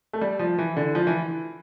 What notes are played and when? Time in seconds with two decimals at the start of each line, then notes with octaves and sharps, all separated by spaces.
0.13 A3
0.21 G3
0.39 F3
0.58 E3
0.77 D3
0.95 F3
1.07 E3